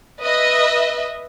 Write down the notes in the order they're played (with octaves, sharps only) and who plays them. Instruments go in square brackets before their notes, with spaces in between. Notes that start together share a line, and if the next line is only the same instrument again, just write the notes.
[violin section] B4 D#5 E5